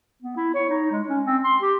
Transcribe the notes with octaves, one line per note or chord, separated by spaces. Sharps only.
B3
E4
C#5
D#4
G#3
C#4
C4
C6
G4